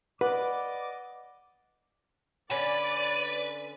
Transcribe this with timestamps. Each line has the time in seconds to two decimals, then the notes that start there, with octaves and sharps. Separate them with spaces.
0.21 B4 D5 D#5 F#5 D6
2.51 D3 C#4 B4 D5